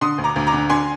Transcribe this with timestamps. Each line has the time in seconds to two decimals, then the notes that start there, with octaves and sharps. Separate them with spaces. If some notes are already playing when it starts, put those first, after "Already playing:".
0.01 D3 C6 D#6
0.18 D2
0.24 A#5 D6
0.36 D2
0.47 A#5 D6
0.53 D3
0.70 D3 G#5 C6